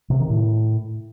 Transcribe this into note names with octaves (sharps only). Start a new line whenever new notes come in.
C3
D#3
A2